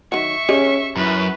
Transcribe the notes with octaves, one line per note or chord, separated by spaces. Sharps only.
D#3 F#3 E5 C#6
C#4 G4 G#4 D#5
F#2 E4 B4